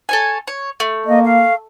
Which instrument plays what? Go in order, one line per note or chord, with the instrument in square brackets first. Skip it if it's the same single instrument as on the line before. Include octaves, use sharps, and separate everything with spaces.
[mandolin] A4 C#5 G#5
C#5
A3
[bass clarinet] A#3 [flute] D#5
[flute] F5